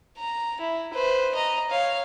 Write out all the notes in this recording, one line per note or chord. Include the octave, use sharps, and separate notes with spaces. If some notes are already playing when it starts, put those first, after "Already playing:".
A#5
E4
B4 C5
D#5 A#5
C#5 F5